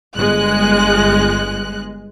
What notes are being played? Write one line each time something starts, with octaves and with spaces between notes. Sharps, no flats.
G1 G#3 F#6